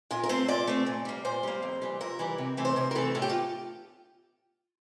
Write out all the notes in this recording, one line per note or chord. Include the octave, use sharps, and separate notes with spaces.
A#2 A#4
A#4
A3 C4 C5
A#2 D5
A3 C4
A#2
G3 A#3
A#2 C5
G3 A#3
F2
E3 G3
F2 A#4
E3 G3
C3
E3 A3 C4
C5
C3 A#4
A#4
E3 A3 C4 A4
A2 A4
G4
F4